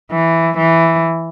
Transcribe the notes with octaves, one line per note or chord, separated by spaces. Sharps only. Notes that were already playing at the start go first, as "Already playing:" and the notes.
E3
E3